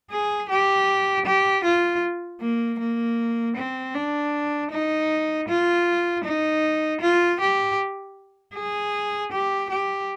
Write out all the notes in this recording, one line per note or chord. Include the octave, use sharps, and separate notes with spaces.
G#4
G4
G4
F4
A#3
A#3
C4
D4
D#4
F4
D#4
F4
G4
G#4
G4
G4